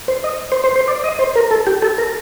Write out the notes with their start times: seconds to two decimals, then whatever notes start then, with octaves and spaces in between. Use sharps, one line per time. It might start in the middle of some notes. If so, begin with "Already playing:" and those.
0.08 C5
0.24 D#5
0.52 C5
0.64 C5
0.76 C5
0.88 D5
1.04 D#5
1.19 C5
1.36 A#4
1.51 A4
1.67 G4
1.82 A4
1.98 A#4